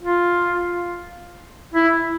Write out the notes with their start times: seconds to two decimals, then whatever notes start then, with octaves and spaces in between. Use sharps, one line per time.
0.02 F4
1.74 E4